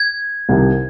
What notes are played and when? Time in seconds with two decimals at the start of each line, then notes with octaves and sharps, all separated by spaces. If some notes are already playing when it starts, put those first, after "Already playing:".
Already playing: G#6
0.49 C2 C3 D#3